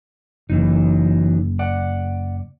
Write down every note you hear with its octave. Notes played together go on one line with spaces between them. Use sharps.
F#1 E3 F#3 D#4
D5 F#5